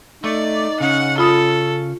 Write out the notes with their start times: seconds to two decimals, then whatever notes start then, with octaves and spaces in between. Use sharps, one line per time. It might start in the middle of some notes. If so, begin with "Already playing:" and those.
0.24 A3 D#4 D5
0.80 C#3 C#4 F#5
1.18 F4 A4 B5 D#6